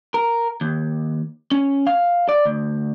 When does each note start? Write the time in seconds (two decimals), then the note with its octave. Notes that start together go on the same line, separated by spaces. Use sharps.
0.14 A#4
0.61 D#2
1.51 C#4
1.87 F5
2.29 D5
2.45 D2